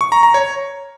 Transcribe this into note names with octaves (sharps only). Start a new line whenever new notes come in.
C#6
A#5
A#5
C#5